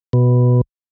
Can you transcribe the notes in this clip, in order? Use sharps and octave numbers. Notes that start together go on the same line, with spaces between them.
B2